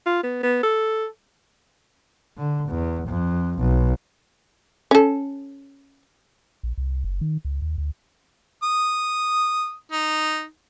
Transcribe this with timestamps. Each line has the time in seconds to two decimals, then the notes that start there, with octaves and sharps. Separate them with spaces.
0.06 F4
0.23 B3
0.43 B3
0.63 A4
2.38 D3
2.69 E2
3.09 F2
3.59 B1
4.91 C#4 A4
6.63 A#1
6.78 C2
7.04 F#1
7.21 D#3
7.45 C#2
7.62 D#2
7.78 D2
8.63 D#6
9.92 D#4